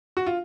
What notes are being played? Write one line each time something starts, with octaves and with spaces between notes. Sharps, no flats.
F#4
F4